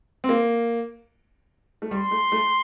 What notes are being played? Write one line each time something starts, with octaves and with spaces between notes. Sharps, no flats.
C4
A#3
A3
G3 C6
A3
A3